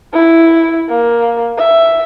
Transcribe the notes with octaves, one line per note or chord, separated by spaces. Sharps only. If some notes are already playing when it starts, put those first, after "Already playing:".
E4
A#3
E5